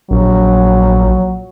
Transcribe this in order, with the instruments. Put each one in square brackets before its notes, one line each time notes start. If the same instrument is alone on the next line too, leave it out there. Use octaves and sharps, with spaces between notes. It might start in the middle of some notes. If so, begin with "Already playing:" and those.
[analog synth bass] A#1 [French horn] F#3